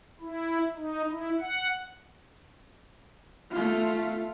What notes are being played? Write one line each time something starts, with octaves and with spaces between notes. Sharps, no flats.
E4
D#4
E4
F#5
A3 F4